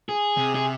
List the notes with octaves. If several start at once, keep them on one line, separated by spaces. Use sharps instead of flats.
G#4
C3
G#4